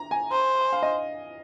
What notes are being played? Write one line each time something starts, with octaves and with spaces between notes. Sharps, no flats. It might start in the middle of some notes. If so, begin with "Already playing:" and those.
Already playing: A#5
G#5
C5
F5
D#5